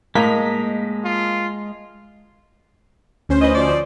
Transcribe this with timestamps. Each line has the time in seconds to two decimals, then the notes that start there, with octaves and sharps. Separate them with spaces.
0.15 A2 G#3 A#3 D#5 A#5 B6
1.05 F4
3.29 D2 C#4 C5
3.42 E3 B4 D#5
3.55 F3 D#4 D5